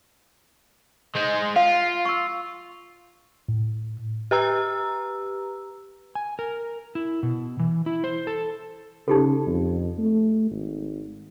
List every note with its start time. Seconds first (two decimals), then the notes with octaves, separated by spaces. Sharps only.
1.16 G#3 C5
1.56 F4 F5
2.06 C#6 E6
3.49 A2
4.31 G4 B4 A#5 E6
6.15 G#5
6.39 A#4
6.95 E4
7.23 B2
7.59 E3
7.86 E4
8.04 C5
8.27 A4
9.08 C#3 D#4 G4 A4
9.47 F2
9.98 A3
10.51 G#1